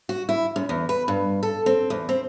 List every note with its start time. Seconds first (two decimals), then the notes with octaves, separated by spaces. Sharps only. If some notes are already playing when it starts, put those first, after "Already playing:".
0.09 F#4
0.29 E4
0.56 F#2
0.69 E2
0.89 B4
1.08 G2
1.43 A4
1.66 C4
1.90 E2
2.09 C4